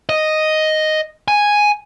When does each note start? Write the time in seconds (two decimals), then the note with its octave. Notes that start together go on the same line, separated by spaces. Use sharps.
0.09 D#5
1.28 G#5